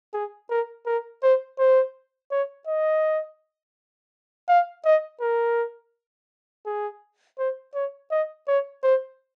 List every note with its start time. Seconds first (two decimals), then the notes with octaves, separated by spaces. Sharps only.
0.14 G#4
0.50 A#4
0.86 A#4
1.23 C5
1.59 C5
2.31 C#5
2.67 D#5
4.48 F5
4.85 D#5
5.21 A#4
6.66 G#4
7.38 C5
7.74 C#5
8.11 D#5
8.48 C#5
8.84 C5